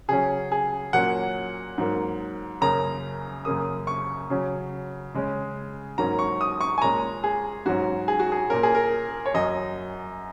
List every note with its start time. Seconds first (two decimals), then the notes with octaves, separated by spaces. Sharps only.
0.08 C#3 F#3 C#4 G#4
0.52 G#4
0.93 A#2 F#3 A#3 C#4 F#5
1.78 G#2 F#3 A#3
2.61 F#2 C#3 A#3 C#4 A#5
3.45 F#2 C#3 A#3 D#6
3.87 C#6
4.30 C#3 F#3 C#4
5.14 C#3 G#3 C#4
5.98 G#2 F#3 A#3 C#4 A#5
6.19 C#6
6.41 D#6
6.61 C#6
6.78 G#5
6.82 A#2 G#3 C#4 A#5
7.24 G#4
7.66 G#2 F#3 C#4 F#4
8.08 G#4
8.19 F#4
8.32 G#4
8.50 A#2 A#3 C#4 A#4
8.63 G#4
8.75 A#4
9.26 C#5
9.34 F#2 F#3 C#4 D#5